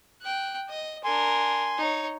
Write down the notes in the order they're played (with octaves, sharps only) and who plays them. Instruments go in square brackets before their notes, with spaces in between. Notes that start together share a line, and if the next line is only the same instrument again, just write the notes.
[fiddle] G5 F#6
D#5
[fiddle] D4 A#4 [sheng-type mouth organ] G#5 C6
[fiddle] D#4 C#5